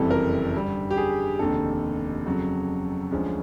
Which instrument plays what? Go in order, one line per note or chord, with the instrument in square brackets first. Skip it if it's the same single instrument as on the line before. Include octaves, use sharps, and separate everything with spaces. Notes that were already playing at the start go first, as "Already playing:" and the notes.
Already playing: [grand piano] F#1 F2 C3 E3 G3 A4
A#4
G2 D3 G3
G4
G#4
F1 D#2 D3 A4
F2 C#3 F#3
D2 D3 F3 G#3 C#4